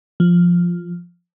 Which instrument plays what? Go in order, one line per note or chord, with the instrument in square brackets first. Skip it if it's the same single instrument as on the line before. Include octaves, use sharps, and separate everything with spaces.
[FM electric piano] F3